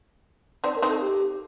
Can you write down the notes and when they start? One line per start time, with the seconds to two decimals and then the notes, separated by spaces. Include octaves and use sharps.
0.64 C4 D#4 D5
0.76 A#4
0.82 C4 D#4
0.89 A4
1.01 G4